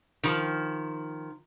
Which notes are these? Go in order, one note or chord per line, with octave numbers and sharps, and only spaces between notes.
D#3 F3